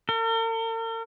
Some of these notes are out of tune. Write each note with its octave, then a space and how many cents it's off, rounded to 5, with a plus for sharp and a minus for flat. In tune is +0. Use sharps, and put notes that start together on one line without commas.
A#4 -45